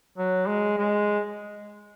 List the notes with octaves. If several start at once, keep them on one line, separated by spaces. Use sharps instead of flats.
F#3
G#3
G#3